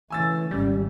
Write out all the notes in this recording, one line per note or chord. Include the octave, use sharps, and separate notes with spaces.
C#3 E3 A3 G#5 E6 A6
G#1 G3 C#4